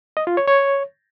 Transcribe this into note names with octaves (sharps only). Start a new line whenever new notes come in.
D#5
F4
C#5
C#5